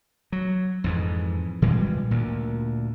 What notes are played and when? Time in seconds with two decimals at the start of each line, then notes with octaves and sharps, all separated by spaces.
0.32 F#3
0.84 F2 G#2 E3
1.62 A#2 E3 G3 G#3
2.11 D2 A#2